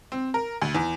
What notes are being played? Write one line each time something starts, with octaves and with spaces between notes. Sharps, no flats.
C4
A#4
D2
E2